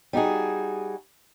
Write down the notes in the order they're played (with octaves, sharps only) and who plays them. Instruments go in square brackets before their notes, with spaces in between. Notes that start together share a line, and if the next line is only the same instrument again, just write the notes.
[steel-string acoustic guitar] G3 D#4 F#4 G#4